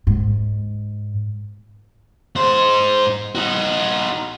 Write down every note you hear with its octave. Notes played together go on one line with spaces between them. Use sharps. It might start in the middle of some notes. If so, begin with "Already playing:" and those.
G#2
G#2 C5
D#4 F#4